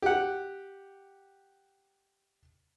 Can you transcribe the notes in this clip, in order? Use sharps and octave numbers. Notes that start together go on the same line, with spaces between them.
G4 F#5